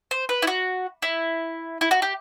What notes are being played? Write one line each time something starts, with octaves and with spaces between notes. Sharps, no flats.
C5
B4
E4
F#4
E4
E4
F#4
G4